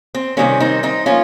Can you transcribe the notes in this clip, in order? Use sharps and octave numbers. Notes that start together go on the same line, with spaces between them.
C4
C3 D#3 G3 A#3 C#4
C4 D#4
C4 D#4
F3 A#3 C#4 F4